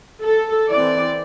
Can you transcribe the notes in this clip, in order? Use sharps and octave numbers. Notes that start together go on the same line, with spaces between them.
A4
E3 C4 D5